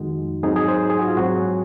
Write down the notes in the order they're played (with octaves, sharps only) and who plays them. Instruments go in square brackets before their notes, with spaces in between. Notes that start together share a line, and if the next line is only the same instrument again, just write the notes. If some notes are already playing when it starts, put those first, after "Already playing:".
Already playing: [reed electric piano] F2 D#3 G#3 D#4 F#4
G#2 F#3 C4 D#4 G#4
G#4
C5
G#4
F#4
F4
G#2 F#3 C4 F#4